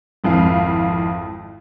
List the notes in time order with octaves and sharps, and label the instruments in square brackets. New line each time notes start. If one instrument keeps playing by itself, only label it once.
[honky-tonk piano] G#1 F2 E4 F5